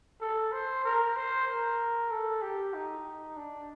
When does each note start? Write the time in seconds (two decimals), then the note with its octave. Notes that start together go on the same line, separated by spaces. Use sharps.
0.20 A4
0.52 C5
0.84 A#4
1.16 C5
1.48 A#4
2.11 A4
2.42 G4
2.74 D#4
3.37 D4